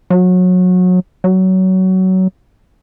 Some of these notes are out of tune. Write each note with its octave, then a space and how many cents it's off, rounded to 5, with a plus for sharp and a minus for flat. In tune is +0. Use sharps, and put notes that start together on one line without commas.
F#3 -25
F#3 +20